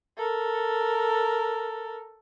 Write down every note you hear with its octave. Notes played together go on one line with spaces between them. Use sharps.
A4 A#4